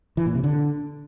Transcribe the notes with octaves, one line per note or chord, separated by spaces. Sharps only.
E3
A#2
C3
D3